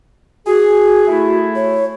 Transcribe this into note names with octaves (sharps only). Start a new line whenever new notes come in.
F#4 G#4
A3 E4
C#5